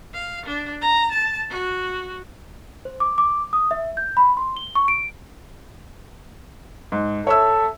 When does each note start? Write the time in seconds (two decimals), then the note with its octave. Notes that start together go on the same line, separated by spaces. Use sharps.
0.15 F5
0.46 D4
0.82 A#5
1.12 A5
1.51 F#4
2.85 C5
3.00 D6
3.18 D6
3.53 D#6
3.71 E5
3.97 G6
4.17 B5
4.37 C6
4.57 G7
4.75 C#6
4.88 D7
6.92 G#2
7.27 A4 C#5 E5 E6